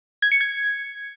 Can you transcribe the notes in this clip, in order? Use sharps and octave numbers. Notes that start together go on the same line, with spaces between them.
G#6
C#7
G#6